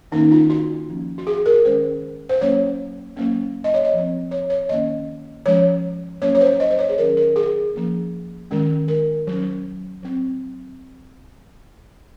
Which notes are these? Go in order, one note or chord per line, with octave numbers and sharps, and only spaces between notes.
D#3 A#3 C#4 D#4
F4
F#4
F3 A#3 C#4
F#4
G#4
A#4
D#3 G#3 C#4 C5
C5
F#3 A#3 C#4 C#5
F#3 A#3 C#4
D#5
C#5
D#5
F3 C4
C#5
C#5
D#3 A#3 C#4 D#5
F3 G#3 C#4 C#5
F#3 A#3 C#4 C#5
C#5
C5
D#5
C5
C#5
G#4
D#3 F#3 C#4 A#4
A#4
G#4
F3 A#3 C#4
D#3 G#3 C#4
A#4
F#3 C#4
F#3 C4